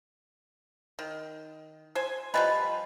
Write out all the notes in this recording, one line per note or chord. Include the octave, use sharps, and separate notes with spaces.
D#3
C5 G#5
F3 G3 B4 D#5 G#5 B5